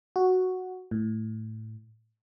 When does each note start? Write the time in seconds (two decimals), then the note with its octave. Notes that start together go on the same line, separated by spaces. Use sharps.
0.16 F#4
0.91 A2